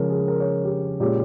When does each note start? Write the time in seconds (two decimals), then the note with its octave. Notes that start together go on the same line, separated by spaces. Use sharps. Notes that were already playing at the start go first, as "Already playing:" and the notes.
Already playing: C#3 F3 G#3 C#4 G#4 A#4
0.10 G#4
0.28 A#4
0.40 C#5
0.64 G4
1.00 A#2 G#3 C#4 G4